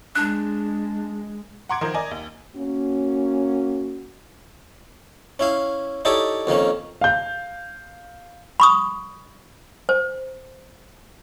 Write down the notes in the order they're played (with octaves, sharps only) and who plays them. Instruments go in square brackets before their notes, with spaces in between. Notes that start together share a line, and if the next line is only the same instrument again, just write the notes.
[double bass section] G#3 [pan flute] D4 [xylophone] F#6
[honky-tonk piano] F#5 A#5 C6 D6 G#6 D7
D#3 F3 A#4 C5
A#4 D5 D#5 G#5
D#2
[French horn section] A#3 C#4 F#4
[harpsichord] C#4 E4 F5
D#4 E4 G4 A4 C#5 D5
F2 D#3 A#3 C#4
[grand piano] F5 G6
[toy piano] B5 C#6 D#6
C5